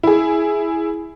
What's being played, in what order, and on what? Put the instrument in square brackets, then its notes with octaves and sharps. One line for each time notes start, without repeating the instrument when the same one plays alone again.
[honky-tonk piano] E4 G#4